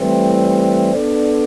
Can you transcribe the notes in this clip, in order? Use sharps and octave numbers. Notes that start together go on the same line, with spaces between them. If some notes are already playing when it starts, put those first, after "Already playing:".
Already playing: A2 E3 G3 C4
B3 D4 A4 D5